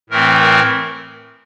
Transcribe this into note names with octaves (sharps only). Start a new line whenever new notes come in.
A2 E3 A3 C4 A#4
A#4